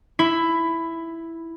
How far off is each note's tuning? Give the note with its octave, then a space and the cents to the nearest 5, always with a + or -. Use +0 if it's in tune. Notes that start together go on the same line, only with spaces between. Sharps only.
E4 +0 B5 +15